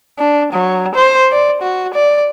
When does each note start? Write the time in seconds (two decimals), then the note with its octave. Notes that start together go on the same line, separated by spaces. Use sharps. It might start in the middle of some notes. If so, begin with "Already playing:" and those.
0.18 D4
0.53 F#3
0.95 C5
1.32 D5
1.62 F#4
1.94 D5